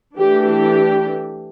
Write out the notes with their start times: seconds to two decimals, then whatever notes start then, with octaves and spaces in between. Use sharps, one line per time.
0.18 E3 A3 D4 G4
0.46 G4